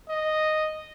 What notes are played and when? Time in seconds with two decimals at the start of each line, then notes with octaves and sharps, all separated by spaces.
0.09 D#5